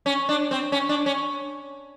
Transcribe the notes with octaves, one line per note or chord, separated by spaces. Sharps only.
C#4
D4
C4
C#4
D4
C#4